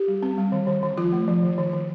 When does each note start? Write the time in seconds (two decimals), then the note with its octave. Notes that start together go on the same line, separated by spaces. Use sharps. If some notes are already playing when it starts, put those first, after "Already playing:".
Already playing: G4
0.08 G3
0.23 C4
0.38 G3
0.52 D#3
0.67 D#3
0.83 D#3
0.98 F3 F4
1.12 A3
1.28 F3
1.43 D#3
1.58 D#3
1.73 D#3